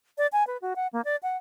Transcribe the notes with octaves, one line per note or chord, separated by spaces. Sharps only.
D5
G#5
B4
F#4
F#5
A#3
D5
F#5